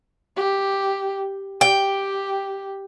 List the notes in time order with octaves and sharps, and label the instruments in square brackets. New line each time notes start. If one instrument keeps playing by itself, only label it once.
[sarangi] G4
[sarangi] G4 [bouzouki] G5